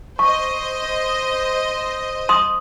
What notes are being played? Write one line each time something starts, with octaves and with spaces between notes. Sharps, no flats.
C5 D#5 C#6
C6 D#6